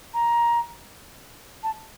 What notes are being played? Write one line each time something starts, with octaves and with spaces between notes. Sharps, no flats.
A#5
A5